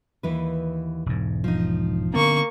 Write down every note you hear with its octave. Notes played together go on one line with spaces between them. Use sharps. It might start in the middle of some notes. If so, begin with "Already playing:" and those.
D#2 E3 B4
E1 G#2
F3 D#4
D3 A#3 B3 C#4 C#6